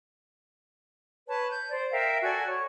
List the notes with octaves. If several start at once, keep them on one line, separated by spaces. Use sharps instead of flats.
B4 C#5 A5
G6
C5 D5
A#4 E5 F5 G5
F#4 A4 D5 G#5
C#5